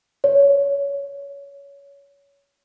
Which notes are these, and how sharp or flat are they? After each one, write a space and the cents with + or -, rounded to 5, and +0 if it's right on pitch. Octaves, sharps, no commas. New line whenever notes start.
C#5 +20